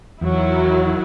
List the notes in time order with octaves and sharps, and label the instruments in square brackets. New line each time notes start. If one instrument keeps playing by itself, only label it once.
[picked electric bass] E2 [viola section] D#3 F#3 E4